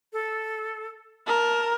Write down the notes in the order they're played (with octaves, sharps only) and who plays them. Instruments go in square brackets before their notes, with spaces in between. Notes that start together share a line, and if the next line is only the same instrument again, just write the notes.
[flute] A4
[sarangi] A#4 [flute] A5